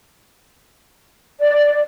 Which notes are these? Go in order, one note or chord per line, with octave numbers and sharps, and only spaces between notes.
D5